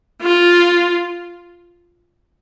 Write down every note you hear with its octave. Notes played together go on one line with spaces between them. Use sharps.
F4